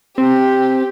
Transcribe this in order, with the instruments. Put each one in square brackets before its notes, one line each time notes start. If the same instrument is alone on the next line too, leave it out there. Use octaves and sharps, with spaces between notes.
[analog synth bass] C4 [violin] G4